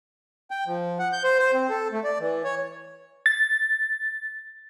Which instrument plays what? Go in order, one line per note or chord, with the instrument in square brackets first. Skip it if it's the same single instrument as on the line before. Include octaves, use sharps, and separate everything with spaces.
[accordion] G5
F3
F#5
G6
C5
C5
C4
A4
A3
D5
E3
C#5
[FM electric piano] A6